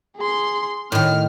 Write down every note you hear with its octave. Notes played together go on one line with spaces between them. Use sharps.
G#4 C6
A2 D#3 F6